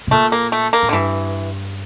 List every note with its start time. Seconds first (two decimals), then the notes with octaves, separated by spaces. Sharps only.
0.07 C3
0.11 A#2 A3
0.32 A#3
0.52 A3
0.73 A#3
0.83 A2
0.89 D3
0.93 G2 E3